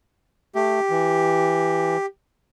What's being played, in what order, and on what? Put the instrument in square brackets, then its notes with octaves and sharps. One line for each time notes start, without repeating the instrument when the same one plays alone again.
[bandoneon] A3 [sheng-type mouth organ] G4
[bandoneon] E3